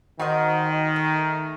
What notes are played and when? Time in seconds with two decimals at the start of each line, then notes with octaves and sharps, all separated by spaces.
0.20 D#3 F#4 C5 D#5
0.96 A3